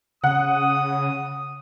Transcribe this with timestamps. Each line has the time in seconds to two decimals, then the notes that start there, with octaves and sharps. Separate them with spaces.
0.24 C#3 F#5 D#6